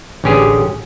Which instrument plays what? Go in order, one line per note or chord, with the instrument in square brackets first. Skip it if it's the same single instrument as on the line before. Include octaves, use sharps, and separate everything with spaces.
[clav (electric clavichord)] A1 D3 C#4 G4 G#4